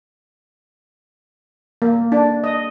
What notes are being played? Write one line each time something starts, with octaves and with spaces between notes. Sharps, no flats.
A#3
D4
D#5